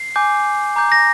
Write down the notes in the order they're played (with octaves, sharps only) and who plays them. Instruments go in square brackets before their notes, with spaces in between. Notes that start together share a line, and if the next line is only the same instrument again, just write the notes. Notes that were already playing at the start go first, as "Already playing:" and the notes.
Already playing: [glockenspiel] C7
G#5 D6 G6
A#5 D6 G6
A#6